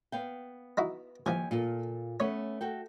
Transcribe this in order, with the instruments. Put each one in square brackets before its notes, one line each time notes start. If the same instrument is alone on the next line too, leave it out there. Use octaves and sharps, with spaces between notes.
[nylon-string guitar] B3 F5 G5
[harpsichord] D#4 E4 F#4
[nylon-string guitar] D#2 G4 G#5 [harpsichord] E3 F3
[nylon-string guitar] A#2 F4 A4
[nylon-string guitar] A3 B3 C#4 [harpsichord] C#5
[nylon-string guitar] F#4 A4 G5